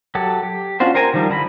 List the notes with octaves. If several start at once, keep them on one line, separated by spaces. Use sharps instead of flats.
F#3 G4 A4
G4
C#4 D4 F4 F#4 C5
A#4 C5 G5 G#5 A#5
D#3 F3 G3 D4
D3 E4 A#5 B5